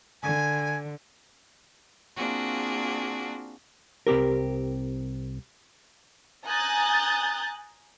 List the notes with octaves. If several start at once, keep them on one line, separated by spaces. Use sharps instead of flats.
D3 G#5
A#3 C4 D4 F4 F#4 G#4
C2 C4 G4 A#4
G#5 A#5 D#6 F#6 G6 A6